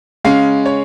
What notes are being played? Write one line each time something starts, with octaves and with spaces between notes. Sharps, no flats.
C#3 G#3 C#4 F5
C#5